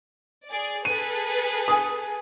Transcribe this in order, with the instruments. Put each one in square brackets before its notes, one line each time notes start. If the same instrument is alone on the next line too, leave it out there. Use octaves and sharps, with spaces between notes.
[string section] G#4 D5
[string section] G#4 A4 B4 [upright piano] D#7
[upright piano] G#5 D#6